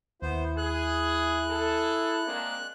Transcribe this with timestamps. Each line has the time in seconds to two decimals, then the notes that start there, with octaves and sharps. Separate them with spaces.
0.22 D#2 B3 E4 C5
0.57 G#4 F#6
1.50 G#4 A4
2.27 G#3 A#3 C4 D4